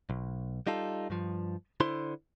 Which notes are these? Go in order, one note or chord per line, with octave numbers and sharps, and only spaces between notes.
B1
G3 D#4 F4 A4
G2 F3
D3 E4 C5 C6